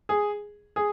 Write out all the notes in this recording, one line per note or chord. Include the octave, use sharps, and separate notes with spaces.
G#4
G#4